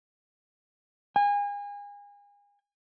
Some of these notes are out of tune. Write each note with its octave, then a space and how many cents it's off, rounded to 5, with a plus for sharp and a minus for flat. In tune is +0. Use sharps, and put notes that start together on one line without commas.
G#5 -35